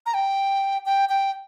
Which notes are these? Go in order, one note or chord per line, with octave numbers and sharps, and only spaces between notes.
A#5
G5
G5
G5